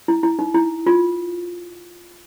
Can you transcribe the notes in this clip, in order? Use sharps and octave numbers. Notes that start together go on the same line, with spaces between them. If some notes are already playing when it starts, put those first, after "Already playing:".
E4
E4
D#4
E4
F4